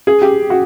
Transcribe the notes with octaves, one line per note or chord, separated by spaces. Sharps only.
G#4
G4
F#4